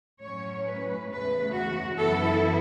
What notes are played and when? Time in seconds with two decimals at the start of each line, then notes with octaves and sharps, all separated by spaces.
0.21 A2 F#3 C#4 C#5
0.66 B4
1.10 E2 C#3 A3 B4
1.54 F#4
1.98 F#2 E3 B3 E4 A4